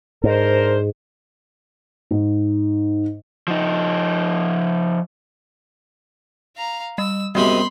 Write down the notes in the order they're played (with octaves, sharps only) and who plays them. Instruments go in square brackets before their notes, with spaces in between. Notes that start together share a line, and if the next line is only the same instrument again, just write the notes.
[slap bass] G#2 [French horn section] D4 A#4 C5
[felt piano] G#2
[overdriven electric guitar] F3 D#4
[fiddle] F5 A#5
[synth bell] G3 [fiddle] E6
[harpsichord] F#2 C3 G#3 [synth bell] G3 B3 [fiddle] B5 C6